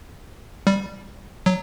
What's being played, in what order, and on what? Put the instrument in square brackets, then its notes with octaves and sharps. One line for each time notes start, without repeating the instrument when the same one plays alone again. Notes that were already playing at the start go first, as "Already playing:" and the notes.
[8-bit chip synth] G3
F#3